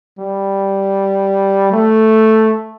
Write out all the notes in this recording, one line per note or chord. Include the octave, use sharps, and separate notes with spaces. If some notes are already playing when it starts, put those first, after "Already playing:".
G3
A3